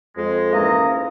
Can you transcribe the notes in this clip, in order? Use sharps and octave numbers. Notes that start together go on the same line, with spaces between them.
F2 G#3
G#2 E3 A#3 C#4 D#5 A#5